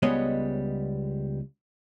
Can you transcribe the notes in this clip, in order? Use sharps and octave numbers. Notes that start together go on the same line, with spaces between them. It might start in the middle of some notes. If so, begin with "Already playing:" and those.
C#2 G3 G#3 B3 C#5 D#5